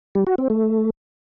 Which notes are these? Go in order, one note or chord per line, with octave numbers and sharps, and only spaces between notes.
G3
F#4
C4
A3